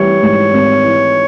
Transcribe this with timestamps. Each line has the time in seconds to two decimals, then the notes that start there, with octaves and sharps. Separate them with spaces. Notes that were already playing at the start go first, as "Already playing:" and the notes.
Already playing: E3 G3 C#5
0.22 G#2
0.53 G#1
0.84 E3